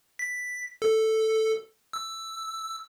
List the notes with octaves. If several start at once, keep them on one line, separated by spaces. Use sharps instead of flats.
B6
A4
E6